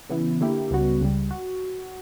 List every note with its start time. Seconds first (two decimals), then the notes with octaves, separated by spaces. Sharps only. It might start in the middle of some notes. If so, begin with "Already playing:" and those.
0.09 C#3 E3 B3 E4
0.41 D3 A#3 E4 G4
0.71 C#2 C#3 G3 B3 F#4
1.01 C#2 C#3 G3
1.31 F#4